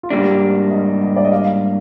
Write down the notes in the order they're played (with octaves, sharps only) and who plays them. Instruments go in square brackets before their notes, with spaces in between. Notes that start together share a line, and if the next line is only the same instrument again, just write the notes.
[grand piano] F4
[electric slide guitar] G#2 G3 A#3 D4 [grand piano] G4
[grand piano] D#5
D#5
D5
D#5
F5